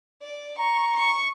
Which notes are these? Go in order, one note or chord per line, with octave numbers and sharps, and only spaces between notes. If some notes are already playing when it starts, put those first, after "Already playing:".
D5
A#5 C#6
C#6